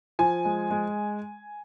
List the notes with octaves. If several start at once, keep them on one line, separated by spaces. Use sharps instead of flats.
F3 G#5
G#3
G#3